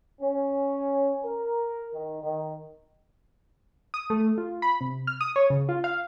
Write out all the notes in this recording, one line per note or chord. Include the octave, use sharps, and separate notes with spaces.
C#4
A#4
D#3
D#3
D#6
A3
F4
B5
C3
F6
D#6
C#5
C#3
F4
F5